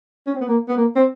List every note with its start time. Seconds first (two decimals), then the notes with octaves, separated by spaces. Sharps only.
0.27 C#4
0.35 C4
0.41 B3
0.48 A#3
0.68 B3
0.77 A#3
0.96 C4